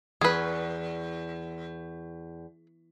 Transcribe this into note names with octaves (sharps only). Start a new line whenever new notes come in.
E2 G#4 B4